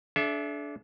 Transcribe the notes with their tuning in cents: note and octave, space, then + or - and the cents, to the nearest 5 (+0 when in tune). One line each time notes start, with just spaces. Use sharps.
D4 -15 A4 -45 E5 +10